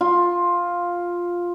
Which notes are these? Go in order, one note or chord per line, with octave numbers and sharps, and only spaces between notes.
F4